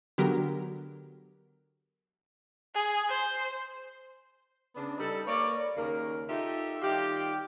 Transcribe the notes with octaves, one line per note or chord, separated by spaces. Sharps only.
D3 F#3 B3 G4 A#4
G#4
C5
C#3 B3 D4
G3 D#4 A4
A#3 B4 C#5 D5
D#2 C#3 A#3 A#4
D#4 F4 G4 A4 E5
D#3 G3 F4 G4